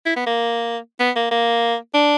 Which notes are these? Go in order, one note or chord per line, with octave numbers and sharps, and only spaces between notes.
E4
B3
A#3
B3
A#3
A#3
D4